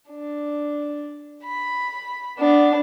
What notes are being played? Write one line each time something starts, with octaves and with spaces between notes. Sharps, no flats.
D4
B5
B3 D4